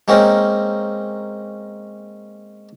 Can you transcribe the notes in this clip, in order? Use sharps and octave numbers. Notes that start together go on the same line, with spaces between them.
G#3 A#3 C4 C#4 D#4